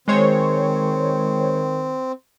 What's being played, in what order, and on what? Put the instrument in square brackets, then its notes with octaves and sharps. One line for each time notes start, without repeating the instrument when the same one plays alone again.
[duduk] D#3 [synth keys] G#3 C5 C#5 [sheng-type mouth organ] C4